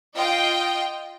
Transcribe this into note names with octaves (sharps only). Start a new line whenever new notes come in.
F4 D#5 G5